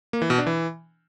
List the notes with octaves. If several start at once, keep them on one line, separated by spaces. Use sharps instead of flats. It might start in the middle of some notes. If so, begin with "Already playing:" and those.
A#3
E3
B2
D4
E3